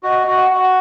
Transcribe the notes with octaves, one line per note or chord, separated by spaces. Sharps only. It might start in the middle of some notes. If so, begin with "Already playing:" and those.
F#4 D#5
D#5
F#4
F#5
F#4
F#5